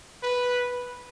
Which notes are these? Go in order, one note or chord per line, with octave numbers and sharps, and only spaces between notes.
B4